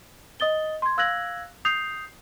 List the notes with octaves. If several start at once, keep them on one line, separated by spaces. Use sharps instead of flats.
D#5 D#6 A6 G7
C6 G#6
F5 E6 F#6 G#6 A#6 F#7
D#6 G6 C7 F7